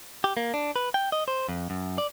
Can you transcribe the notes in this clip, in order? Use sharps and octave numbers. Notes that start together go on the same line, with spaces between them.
G4
A#3
D4
B4
G5
D#5
C5
F2
F#2
D5